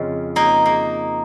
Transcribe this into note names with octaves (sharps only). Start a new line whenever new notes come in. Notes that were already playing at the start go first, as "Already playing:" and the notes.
Already playing: F2 C#3 G#3
A#3 D#4
A#3